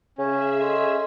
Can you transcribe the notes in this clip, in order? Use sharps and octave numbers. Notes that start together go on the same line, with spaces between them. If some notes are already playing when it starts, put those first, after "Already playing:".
C#3 C#4 G#4 E5 E6
C#4 A4 D#5 C6